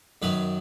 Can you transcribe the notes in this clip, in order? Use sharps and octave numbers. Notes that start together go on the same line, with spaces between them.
F#2 D#3 F#3 B4